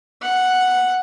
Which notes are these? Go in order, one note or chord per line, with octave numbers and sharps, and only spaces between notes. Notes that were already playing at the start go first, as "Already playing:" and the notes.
F#5